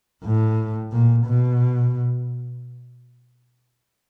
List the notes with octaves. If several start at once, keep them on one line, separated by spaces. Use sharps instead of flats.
A2
A#2
B2